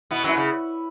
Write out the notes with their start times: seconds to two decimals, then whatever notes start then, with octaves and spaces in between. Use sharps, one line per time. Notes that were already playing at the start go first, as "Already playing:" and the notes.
0.11 B2 B3 E4
0.24 F#2 F#3 E4
0.37 C#3